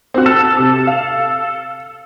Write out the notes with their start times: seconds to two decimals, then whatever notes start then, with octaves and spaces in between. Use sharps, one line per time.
0.14 C4 F#4
0.26 A4 A5 F6
0.57 C3
0.87 F5